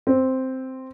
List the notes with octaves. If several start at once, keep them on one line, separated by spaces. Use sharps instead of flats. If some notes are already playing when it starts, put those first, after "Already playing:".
C4